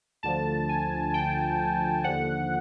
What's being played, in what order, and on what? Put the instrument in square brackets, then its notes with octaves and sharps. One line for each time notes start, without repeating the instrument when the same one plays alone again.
[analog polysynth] D2 D3 F3 A5
G#5
G5
D#2 D3 F3 F#5